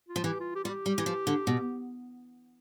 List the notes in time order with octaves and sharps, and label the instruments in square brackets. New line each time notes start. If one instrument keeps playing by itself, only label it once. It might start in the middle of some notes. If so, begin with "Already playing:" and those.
[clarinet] F4
[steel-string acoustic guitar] F3
[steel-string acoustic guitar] E3 [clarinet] G4
[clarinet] F4
G4
[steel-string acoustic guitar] G3 [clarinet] F4
[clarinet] G4
[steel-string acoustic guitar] G3
E3
F3
D3
B2